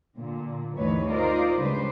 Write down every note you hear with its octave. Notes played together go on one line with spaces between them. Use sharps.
A#2 D3
D2 G2 D#3 E3 B4 C#5
D#4 F4 A#4 C5 D5
C#3 G3 G#3 D4 B4 C5